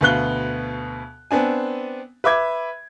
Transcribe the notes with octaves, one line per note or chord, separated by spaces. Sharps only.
D2 B2 B3 F5 F#6 G7
B3 C4 D4 G#5
B4 E5 D6 G#6